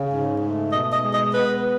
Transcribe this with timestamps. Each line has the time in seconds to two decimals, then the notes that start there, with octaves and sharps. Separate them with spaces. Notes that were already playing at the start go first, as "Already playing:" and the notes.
Already playing: C#3
0.11 G#2
0.41 A3
0.72 B2 D#5
0.93 D#5
1.03 G#3
1.14 D#5
1.34 B3 B4